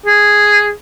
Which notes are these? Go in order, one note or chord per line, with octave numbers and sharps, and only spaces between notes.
G#4